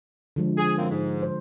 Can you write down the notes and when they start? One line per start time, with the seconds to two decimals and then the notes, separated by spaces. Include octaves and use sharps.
0.36 D3 F3 G#3
0.58 G#4
0.78 F#2 A#3 C4
0.90 G#2
1.23 C5